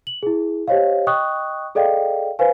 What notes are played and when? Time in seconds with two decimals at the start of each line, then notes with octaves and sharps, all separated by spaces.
0.07 F#7
0.23 E4 G#4
0.68 G4 C5 C#5 D#5 F5
1.07 D#5 G5 C#6 D#6 F#6
1.75 G#4 A4 D5 D#5 F5 G5
2.39 B4 C5 F5 G#5